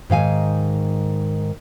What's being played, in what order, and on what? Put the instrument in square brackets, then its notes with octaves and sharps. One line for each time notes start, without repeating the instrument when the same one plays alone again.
[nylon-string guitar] G#2 D#3 F5 G#5